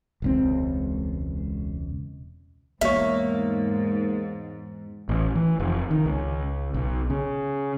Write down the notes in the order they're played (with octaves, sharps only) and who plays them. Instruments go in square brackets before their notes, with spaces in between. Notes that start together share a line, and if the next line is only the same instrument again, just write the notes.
[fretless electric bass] E1 C#2 C4
[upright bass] E2 [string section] G#2 [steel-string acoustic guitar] A#3 [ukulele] C#5 E5
[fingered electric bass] A1
E3
F1
D#3
C#2
B1
C#3